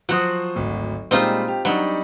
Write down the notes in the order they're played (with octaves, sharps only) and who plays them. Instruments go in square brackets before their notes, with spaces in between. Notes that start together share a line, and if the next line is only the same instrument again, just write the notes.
[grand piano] F3 C5 D#6 [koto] F#3 F#4
[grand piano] G#1 D2
[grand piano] A#2 G3 G#3 [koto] C4 D#4 F4
[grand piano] G4
[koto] F#3 [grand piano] G3 D4 D#4